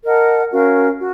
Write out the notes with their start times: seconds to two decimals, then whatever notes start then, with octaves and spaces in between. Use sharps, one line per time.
0.05 A#4 D#5 F#5 A5
0.52 C#4 F#4 A#4 F5
0.98 F#4